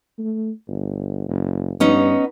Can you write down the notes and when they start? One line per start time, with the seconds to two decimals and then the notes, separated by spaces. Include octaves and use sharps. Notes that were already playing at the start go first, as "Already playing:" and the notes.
0.19 A3
0.68 G1
1.29 F#1
1.80 G2 B3 C#4 D#4